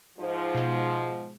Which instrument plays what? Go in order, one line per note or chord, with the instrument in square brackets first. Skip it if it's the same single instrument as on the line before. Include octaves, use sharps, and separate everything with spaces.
[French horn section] G#2 F3
[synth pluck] B2 G#3